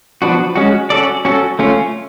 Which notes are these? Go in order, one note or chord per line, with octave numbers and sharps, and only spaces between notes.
F3 B3 D4 F#4
G#3 C#4 F#4
C#4 F#4 A4 D5
C#4 F#4 A4
A3 C#4 F4